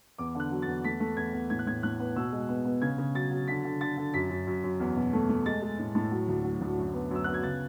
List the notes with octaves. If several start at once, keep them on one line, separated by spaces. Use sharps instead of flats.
E2 D6
D3 F#6
F#3
A6
E2
A3 B6
A3
E2 G#6
E2
A2 G#6
F#6
A2 G#6
A2 F#6
B3
B2 E6
G#3
B3
B3
C#3 G#6
C#3
F#3 A6
F#3
D3 B6
D3
D3 A6
D3
F#2 B6
F#2
F#2
F#2
E2
B2
A3
A3
G#3 A6
G#3
A2
A2
F#3
D2
F#3
D2
F#2
B3
F#2 E6
B3 F#6
G#6
C#3 A6